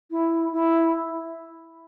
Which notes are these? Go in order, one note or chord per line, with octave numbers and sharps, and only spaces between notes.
E4
E4